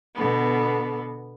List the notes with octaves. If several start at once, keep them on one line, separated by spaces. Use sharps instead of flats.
B2 D3 B3